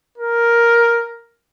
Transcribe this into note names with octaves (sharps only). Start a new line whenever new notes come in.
A#4